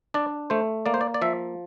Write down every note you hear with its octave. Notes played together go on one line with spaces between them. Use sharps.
D4 D5
A3 C5
A#3 D5
C5
D5
D5
F3 E5